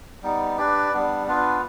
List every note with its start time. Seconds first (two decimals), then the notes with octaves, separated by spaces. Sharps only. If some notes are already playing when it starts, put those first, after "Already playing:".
0.22 G3 B3 D#4
0.57 D4 G4 B4 D5
0.92 G3 B3 D4
1.26 B3 D4 F4 B4